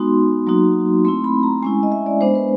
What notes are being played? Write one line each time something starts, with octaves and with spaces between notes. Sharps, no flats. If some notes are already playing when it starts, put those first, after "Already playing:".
Already playing: G#3 B3 D#4 F#4 C6
F#3 A#3 D#4 F#4
A3 C4 E4 C6
B5
A#5
G#3 C#4 E4 G#5
D#5
E5
D5
G#3 B3 D4 C5
B4